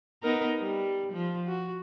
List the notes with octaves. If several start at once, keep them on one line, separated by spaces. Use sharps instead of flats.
B3 D#4 A#4
G3
F3
F#4